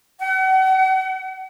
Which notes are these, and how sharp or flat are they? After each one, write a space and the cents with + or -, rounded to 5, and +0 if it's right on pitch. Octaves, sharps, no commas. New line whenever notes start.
F#5 +40